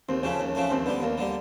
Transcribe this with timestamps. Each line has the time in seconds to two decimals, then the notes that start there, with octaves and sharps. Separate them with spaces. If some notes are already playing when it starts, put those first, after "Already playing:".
0.09 D#2 C4
0.23 C#3 F3 A3 C#4
0.40 D#2
0.55 C#3 F3 A3
0.70 D#2 C4
0.86 D3 G3 B3
1.02 D#2 A#3
1.18 D3 G3